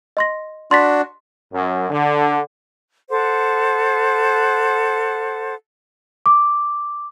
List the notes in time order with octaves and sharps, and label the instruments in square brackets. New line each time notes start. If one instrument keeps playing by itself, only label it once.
[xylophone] D#5 C6 A#6
[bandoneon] D4 F#4 [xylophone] C6 A6 B6
[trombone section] F#2
D3
[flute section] A4 C5 F#5 D6
[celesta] D6